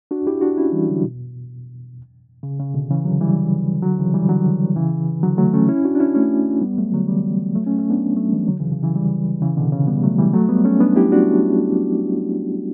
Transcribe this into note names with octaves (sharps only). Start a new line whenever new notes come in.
D4 F#4
E4 G4
D4 F#4
C#4 E4
E3 G3
D3 F#3
B2
C#3
C#3
B2 D3
C#3 E3
D3 F#3
E3 G3
D3 F#3
C#3 E3
E3 G3
D3 F#3
C#3 E3
D3 F#3
F#3 A3
A3 C#4
C#4 E4
D4 F#4
D4
C#4 E4
A3 C#4
G3 B3
F#3 A3
D3 F#3
E3 G3
F#3 A3
A3 C#4
A3 C#4
B3 D4
F#3 A3
E3 G3
D3 F#3
C#3 E3
C#3
C#3 E3
E3 G3
C#3 E3
B2 D3
C#3
G3 B3
F#3 A3
E3 G3
F#3 A3
G3 B3
A3 C#4
B3 D4
E4 G4
D4 F#4